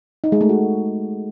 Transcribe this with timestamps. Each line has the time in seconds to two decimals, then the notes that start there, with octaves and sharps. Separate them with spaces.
0.24 D#4
0.32 G#3
0.41 A3
0.49 F#4